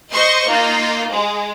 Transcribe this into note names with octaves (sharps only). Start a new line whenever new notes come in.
C5 D#5 C6 C#6
A#3 D#4 F4
G#3